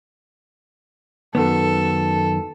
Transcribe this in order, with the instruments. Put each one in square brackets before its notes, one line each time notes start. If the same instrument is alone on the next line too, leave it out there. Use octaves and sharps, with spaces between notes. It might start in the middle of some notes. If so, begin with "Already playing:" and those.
[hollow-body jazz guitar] F#2 D#3 B3 [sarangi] A4